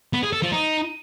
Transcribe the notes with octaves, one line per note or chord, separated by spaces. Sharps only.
B3
G#4
A4
F3
D#4